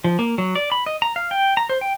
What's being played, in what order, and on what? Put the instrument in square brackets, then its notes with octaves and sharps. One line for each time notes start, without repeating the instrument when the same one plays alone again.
[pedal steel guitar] F3
A#3
F#3
D5
B5
D#5
A#5
F5
G5
A#5
C5
G5